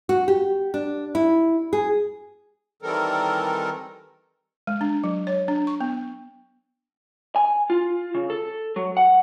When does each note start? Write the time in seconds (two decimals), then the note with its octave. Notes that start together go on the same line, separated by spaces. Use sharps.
0.09 F#4
0.28 G4
0.74 D4
1.15 E4
1.73 G#4
2.82 D#3 E3 G3 C4 A4 A#4
4.67 G#3
4.81 D4
5.04 F#3
5.27 C#5
5.48 D4
5.67 C#6
5.80 B3
7.36 G#5
7.70 F4
8.15 C#3
8.30 A4
8.76 F#3
8.97 F#5